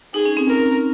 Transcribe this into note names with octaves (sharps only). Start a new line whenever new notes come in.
D#4 G#4
C#4
C4
A#4